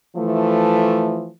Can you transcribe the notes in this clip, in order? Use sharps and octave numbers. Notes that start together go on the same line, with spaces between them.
E3 F3 A3